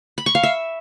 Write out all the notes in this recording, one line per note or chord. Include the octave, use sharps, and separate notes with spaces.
B5
C#6
F5
E5